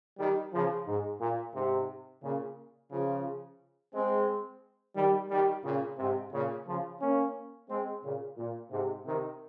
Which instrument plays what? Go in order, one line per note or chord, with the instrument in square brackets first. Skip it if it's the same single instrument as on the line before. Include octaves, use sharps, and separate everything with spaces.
[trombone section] D#3 G3
C#3 F3
G#2
A#2
G#2 C3
A#2 C#3
C#3 F3
G#3 C4
D#3 G3
D#3 G3
A#2 C#3
G#2 C3
A#2 C#3
C#3 F3
A#3 C#4
G#3 C4
A#2 C#3
A#2
G#2 C3
C3 D#3